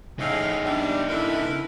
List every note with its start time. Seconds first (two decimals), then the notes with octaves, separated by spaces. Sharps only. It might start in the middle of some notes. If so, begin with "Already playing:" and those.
0.19 A2 C#3 D#4 G#4 F5
0.64 G3 D4
1.09 D3 E4 A#4 B4